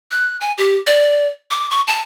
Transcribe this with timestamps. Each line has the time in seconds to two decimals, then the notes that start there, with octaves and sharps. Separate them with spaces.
0.11 F#6
0.41 G#5
0.58 G4
0.87 D5
1.51 D6
1.71 C#6
1.88 A5